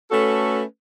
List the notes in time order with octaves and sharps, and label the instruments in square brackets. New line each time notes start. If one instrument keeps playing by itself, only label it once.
[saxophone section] A3 C#4 F#4 A4 B4